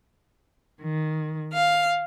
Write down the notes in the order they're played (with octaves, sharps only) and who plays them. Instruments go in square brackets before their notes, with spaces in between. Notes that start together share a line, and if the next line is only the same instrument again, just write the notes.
[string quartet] D#3
F5